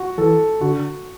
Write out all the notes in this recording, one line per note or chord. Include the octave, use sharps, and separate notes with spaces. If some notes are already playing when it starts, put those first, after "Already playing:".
Already playing: F#4
E3 A4
D3 F#4